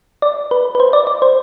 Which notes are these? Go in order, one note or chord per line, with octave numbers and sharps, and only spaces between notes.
D5
B4
B4
C5
D5
D5
C5